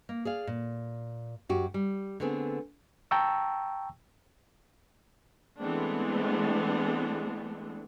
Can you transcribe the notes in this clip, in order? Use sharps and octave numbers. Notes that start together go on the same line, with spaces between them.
A#3
G#4 D5 F5
A#2
F#2 F#4 G4
G3
D3 A3 B3 C4 G#4
G5 A5 A#5 C#6 E6
E3 G#3 A3 B3 C4 D4